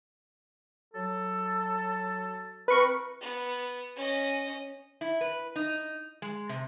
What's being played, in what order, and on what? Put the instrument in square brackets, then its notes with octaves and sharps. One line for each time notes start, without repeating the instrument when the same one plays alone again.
[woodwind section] F#3 A4
[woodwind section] E3 C4 A#4 [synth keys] B4 C#6
[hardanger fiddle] B3
C#4 D#5
[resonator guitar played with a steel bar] E4
B4
D#4
G#3
C3